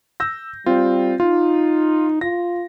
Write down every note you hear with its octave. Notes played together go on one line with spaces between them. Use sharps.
E6 G6 A#6
G3 C4 F4
D#4 F4
F4 A#6